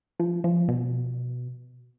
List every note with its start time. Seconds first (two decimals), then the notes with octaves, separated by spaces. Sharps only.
0.19 F3
0.44 F3
0.68 B2